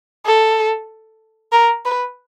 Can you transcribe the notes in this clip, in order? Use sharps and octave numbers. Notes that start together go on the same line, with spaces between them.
A4
A#4
B4